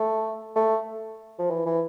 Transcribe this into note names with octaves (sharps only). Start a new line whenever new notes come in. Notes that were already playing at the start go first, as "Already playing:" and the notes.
Already playing: A3
A3
F3
E3
E3